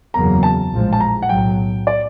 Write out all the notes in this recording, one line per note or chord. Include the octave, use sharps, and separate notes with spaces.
F#1 E2 C#3 F#3 A#3 A#5
A5
A#1 A2 F3 G#3
A5
A#5
F#5
B1 A2 F#3 G5
D5